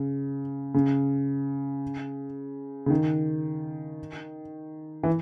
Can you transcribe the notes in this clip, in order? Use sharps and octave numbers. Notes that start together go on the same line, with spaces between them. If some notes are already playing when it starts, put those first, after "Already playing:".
Already playing: C#3
C#3
C#3
D#3
E3